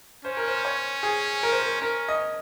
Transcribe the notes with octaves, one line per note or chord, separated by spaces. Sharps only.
C#4 C5
A#4
C5
C#5
G#4
A#4
C5
A#4
C#4 A#4
D#5